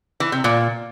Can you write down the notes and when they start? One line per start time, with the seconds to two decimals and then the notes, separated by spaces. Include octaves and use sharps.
0.20 E3
0.32 C3
0.44 A#2